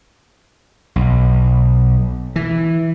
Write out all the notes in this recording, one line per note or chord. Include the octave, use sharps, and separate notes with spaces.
B1
E3